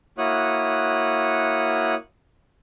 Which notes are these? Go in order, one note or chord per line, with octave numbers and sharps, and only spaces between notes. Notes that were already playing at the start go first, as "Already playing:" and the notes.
A#3 E4 F#4 C#5 D#6 F#6